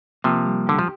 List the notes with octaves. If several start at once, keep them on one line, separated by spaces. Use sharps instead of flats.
C3 F3 A#3
G3
D3 G4
F3